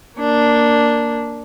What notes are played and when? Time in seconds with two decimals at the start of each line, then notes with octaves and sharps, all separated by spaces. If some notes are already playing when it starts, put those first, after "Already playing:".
0.19 A#3 D4